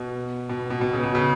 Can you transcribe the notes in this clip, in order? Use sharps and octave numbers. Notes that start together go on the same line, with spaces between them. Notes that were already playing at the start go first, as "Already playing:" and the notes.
Already playing: B2
B2
B2
B2
C#3
B2
C#3